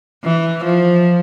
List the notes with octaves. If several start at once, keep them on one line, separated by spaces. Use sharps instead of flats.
E3
F3